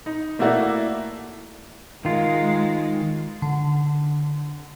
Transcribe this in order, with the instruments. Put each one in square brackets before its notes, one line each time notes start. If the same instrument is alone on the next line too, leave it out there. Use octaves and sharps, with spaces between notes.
[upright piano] D#4
A3 A#3 E4 F#4 D5 E5
[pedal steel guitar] D#3 F4 [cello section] G#3
[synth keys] D3